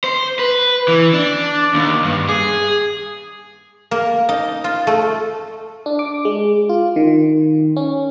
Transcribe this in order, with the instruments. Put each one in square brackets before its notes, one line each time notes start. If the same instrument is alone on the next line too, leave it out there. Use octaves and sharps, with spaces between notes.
[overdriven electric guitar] C5
B4
E3
D4
D#2
G2
G#4
[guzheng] A#3
D#4
F4
A3
[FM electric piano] D4
D6
G#3
F4
D#3
C#4